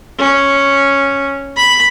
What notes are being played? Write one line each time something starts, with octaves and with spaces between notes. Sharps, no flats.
C#4
B5